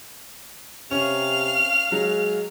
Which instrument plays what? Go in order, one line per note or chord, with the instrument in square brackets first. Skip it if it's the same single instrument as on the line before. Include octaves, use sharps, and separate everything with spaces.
[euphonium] C3 [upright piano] C#4 [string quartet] F5 F6
[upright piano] F#3 [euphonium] G#3